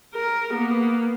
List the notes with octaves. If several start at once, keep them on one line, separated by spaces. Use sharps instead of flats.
A#4
A#3 B3